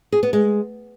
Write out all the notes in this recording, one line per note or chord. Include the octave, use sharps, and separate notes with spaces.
G#4
B3
G#3